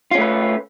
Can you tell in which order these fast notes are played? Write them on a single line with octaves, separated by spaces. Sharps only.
F4 C#4 A3 B4